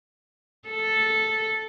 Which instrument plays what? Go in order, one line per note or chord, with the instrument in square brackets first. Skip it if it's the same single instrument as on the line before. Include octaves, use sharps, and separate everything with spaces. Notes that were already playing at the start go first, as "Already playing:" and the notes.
[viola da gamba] A4